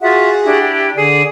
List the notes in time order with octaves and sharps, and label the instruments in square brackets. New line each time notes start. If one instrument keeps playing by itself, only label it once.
[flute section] F4 E5 [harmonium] F#4 G#4 F#5
[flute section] D4 E4 G4
[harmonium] D3 D5 [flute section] G#4